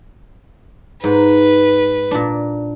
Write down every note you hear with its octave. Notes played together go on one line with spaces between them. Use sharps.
G#2 B4
A#2 D4